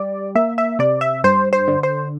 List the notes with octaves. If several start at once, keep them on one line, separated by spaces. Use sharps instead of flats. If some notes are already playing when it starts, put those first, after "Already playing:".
Already playing: G3 D5
A#3 E5
E5
C3 D5
E5
G2 C5
C5
D3
C5